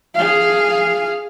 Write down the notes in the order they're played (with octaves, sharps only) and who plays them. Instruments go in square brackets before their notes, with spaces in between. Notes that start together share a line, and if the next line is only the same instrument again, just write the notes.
[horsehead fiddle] G#4 F5